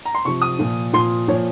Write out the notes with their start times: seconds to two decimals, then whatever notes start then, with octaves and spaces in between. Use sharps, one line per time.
0.05 A#5
0.15 C6
0.25 C3 F3 C#6
0.42 D#6
0.59 A#2 F3
0.93 A#2 F3 C6
1.28 A#2 F3 C#5